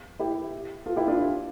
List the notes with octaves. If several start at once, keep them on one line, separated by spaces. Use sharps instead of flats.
E4 G4
F4 A4
E4 G4
D4 F4